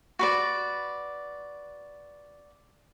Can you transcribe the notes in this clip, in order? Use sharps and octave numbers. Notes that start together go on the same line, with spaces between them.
F#4 B4 D5